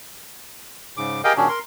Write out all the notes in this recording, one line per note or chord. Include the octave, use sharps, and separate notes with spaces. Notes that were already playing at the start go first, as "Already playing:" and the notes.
G#2 C#3 D6
G4 G#4 A#4 D#5 F5 G5
A#2 D#3 C#4 D4 F#4 G#4
A#4 C6